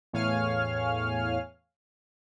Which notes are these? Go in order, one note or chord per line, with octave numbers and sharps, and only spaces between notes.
E2 A2 C#5 F5 G#5 F6